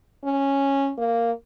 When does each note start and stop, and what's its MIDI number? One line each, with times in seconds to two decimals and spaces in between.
0.24 0.92 61
0.98 1.31 58